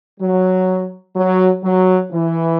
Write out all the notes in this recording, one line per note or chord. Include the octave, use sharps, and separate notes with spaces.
F#3
F#3
F#3
E3